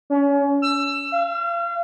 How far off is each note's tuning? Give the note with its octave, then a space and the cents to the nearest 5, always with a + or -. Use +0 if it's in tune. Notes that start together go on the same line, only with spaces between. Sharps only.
C#4 +30
E6 +25
F5 -35